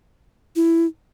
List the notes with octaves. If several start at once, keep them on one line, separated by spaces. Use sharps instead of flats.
E4